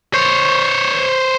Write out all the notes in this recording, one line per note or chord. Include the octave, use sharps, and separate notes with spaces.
C5 C#5